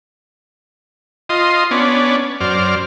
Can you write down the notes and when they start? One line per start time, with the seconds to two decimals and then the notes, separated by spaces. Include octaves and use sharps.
1.29 F4 D#5 C6
1.71 B3 C#4 D4
2.41 F#2 C5 D5 F6